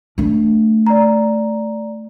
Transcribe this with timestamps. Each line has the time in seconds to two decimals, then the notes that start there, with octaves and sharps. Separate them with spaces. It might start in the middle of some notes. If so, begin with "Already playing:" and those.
0.18 A3 D4
0.87 D5 A#5